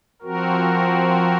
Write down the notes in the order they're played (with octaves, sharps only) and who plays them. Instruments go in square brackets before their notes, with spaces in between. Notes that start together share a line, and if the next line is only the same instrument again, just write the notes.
[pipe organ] F3 C4 F#4 A#4